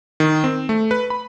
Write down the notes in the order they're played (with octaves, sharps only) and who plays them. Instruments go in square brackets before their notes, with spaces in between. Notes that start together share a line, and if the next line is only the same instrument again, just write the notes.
[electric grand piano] D#3
C4
A3
B4
B5